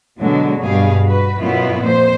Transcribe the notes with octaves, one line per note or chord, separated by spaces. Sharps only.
B2 D3 F#3 G#3
G2 B2 G3 G#4 F5
F#4 B4
F#2 B2 B3 E4 F4
F2 A#2 C5